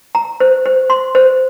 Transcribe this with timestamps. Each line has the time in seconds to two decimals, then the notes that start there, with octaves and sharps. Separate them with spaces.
0.15 A#5
0.40 C5
0.66 C5
0.90 C6
1.15 C5